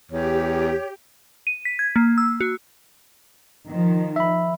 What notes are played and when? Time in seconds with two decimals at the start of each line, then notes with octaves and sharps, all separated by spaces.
0.11 E2 G4 C#5
1.47 D#7
1.65 B6
1.79 G#6
1.96 A#3
2.18 E6
2.41 F#4
3.68 D#3 F3
4.16 E5 B5